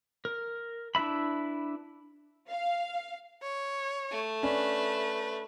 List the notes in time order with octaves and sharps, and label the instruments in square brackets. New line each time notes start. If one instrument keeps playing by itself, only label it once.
[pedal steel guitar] A#4
D4 E4 B4 E5 B5
[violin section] F5
[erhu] C#5
[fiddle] A3
[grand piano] C#4 D4 [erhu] B4